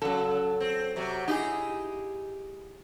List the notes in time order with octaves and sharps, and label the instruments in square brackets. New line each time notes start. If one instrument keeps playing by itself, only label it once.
[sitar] C#3 [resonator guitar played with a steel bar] F#3 A4
[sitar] C4
C3 F#3
[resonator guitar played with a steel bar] D#4 E4 G#4 [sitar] G4